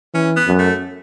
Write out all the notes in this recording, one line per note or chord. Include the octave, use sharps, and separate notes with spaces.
E3 C#4
B3
F#2
A3